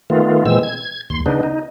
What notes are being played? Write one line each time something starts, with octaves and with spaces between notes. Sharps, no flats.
D#3 A3 B3 F4
A#2 E3 G#3 C4 E6
G#6
D#2 C6
C#3 B3 D4 D#4
D#4